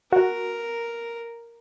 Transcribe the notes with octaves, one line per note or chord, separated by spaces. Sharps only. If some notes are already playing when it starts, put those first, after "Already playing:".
F#4 A#4